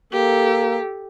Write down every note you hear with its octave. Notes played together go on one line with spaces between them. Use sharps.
A#3 G4 A4